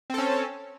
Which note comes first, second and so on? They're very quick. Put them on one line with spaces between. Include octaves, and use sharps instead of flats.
C4 A4 C#4